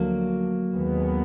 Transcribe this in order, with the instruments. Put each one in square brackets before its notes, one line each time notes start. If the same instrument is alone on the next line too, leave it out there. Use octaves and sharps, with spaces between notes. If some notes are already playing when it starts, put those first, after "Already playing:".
Already playing: [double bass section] D2 D3 F3 [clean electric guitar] F#3 A#3
[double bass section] D#2 D#3 G#3 B3